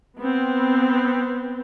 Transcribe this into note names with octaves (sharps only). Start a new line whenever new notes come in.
B3 C4